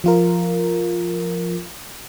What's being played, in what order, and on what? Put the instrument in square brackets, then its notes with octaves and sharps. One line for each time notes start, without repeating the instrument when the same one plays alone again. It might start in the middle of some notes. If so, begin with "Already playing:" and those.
[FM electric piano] F3 F4 A#4